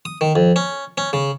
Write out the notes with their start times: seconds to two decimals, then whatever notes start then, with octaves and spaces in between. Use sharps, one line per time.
0.05 D#6
0.21 D#3
0.36 F2
0.56 C#4
0.98 C#4
1.13 C#3